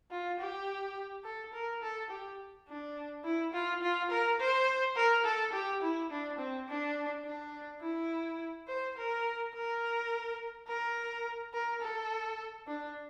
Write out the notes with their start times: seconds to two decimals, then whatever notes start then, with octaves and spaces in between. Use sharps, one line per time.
0.11 F4
0.39 G4
1.24 A4
1.53 A#4
1.82 A4
2.10 G4
2.68 D4
3.24 E4
3.53 F4
3.82 F4
4.11 A#4
4.40 C5
4.96 A#4
5.25 A4
5.53 G4
5.82 E4
6.11 D4
6.38 C4
6.68 D4
7.24 D4
7.81 E4
8.68 C5
8.96 A#4
9.54 A#4
10.67 A#4
11.53 A#4
11.81 A4
12.67 D4